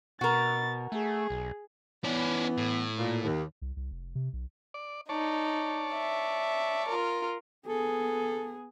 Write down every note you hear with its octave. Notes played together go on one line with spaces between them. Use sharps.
B2 F#4 A#4 A6
A3 G#4
B1
E3 B3 C#4 D5
A2
A#2
D#2
C2
C2
F1
C3
B1
D5
D#4 C#5 D5 A5
E5
F4 A#4
B3 G#4 A4